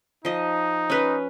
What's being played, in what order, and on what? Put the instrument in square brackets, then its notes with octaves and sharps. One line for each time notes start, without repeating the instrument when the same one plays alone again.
[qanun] F3 D#5 [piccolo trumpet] D#4
[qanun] C#4 B4